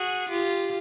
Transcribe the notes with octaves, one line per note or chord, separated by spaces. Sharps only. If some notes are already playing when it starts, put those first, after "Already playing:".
Already playing: F#4 G#4
F4 G4